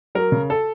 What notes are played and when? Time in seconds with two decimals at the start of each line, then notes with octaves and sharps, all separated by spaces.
0.15 F#3 A#4
0.32 C#3
0.50 A4